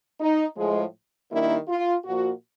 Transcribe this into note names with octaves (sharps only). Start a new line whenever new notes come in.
D#4
A2 F3 G#3
D#3 G3 A#3 D4 E4
F4
A#2 F3 A#3 F#4